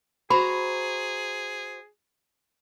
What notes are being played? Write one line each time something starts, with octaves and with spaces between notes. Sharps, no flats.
F#4 G#4 C5 A#5 B5